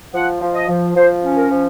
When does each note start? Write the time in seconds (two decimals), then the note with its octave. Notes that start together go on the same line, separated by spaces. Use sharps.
0.13 F3 F#5
0.41 F3
0.55 D#5
0.68 F3
0.95 F3 C5
1.23 C#4
1.37 A#4
1.50 F3